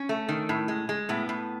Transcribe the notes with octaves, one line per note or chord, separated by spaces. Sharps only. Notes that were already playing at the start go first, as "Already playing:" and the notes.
Already playing: C#4
A3
D#3
A2
G#3
G#3
A2 B3
A2